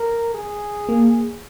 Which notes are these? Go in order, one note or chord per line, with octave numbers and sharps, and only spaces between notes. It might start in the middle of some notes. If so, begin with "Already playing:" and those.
Already playing: A#4
G#4
A#3